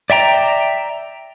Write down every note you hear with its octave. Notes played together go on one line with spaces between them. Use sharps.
D5 E5 G5 A#5